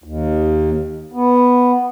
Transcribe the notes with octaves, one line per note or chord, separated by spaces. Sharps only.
D#2
B3